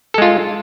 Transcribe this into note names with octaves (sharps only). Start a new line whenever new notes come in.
G#3 F4 A4